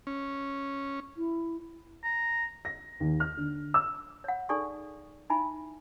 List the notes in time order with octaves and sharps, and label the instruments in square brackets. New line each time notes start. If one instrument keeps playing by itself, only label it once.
[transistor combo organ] C#4
[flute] E4
[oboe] A#5
[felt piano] A#6
D#2
F6
D3
E6
[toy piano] C#5 F#5
D#4 G#4 A4 D5 G#5 C#6
D#4 E4 E5 G#5 B5